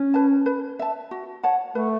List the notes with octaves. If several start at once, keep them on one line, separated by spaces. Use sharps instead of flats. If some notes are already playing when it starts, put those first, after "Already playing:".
Already playing: C#4
B4 A5
B4
E5 A5
F#4
C#5 F#5 A5
A3 B4